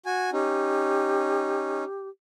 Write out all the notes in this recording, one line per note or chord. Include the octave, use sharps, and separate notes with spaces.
F#4 G#5
C#4 D#4 G4